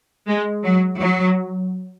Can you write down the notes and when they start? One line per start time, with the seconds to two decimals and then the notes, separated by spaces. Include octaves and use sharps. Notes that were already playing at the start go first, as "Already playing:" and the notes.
0.27 G#3
0.64 F#3
1.01 F#3